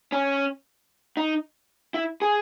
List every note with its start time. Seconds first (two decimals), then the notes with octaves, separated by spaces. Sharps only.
0.12 C#4
1.17 D#4
1.94 E4
2.22 G#4